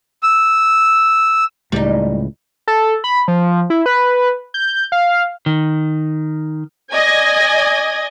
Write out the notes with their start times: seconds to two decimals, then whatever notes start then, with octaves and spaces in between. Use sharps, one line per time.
0.23 E6
1.72 C#2 A2 G3 D#4
2.68 A4
3.04 B5
3.28 F3
3.70 E4
3.86 B4
4.54 G6
4.92 F5
5.46 D#3
6.92 D5 D#5 G#5 G#6 A#6